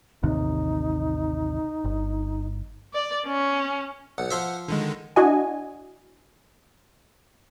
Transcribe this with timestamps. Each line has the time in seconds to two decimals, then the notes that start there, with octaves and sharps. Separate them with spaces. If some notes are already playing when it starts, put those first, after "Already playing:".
0.23 A1 D#2 C3 D#4
1.84 G1
2.93 D5
3.26 C#4
4.18 B1 F#5
4.31 F3 C5 E5
4.68 D3 D#3 G#3
5.16 D4 E4 F#4 D#5 G#5